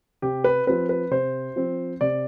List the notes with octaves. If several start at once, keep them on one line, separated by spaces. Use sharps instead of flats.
C3 G4
B4
F3 C4 B4
B4
C3 C5
F3 C4
C3 D5